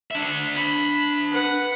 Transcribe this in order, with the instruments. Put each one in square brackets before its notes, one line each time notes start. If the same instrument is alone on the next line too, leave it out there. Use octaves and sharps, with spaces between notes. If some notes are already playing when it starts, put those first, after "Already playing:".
[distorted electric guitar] D4 E5
[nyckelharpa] B5
B4 F#5